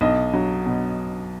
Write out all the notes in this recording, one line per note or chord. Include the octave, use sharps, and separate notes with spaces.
B1 D#5
F#3
B2